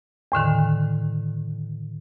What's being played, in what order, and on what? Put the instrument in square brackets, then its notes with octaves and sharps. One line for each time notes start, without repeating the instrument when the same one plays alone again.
[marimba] E2 A2 D3 D#3